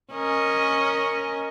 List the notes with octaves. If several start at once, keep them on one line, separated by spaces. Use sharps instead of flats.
C#4 A#4 D#5